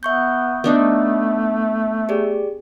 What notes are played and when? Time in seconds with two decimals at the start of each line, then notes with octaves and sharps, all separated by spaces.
0.03 B3 E5 C#6 G6
0.64 A3 B3 D4 D#4
2.09 G4 G#4 D5